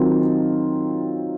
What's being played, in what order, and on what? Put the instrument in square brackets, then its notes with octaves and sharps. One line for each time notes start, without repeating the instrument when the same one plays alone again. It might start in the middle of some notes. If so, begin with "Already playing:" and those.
Already playing: [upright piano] D#3 F#3 C4 F4